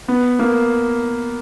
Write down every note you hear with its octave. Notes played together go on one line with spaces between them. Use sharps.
B3
A#3